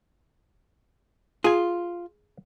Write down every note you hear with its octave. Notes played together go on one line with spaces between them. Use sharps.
F4 G#4 G#5